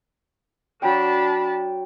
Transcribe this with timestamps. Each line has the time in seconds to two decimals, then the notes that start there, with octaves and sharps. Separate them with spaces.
0.82 F#3 D4 G5 A5 B5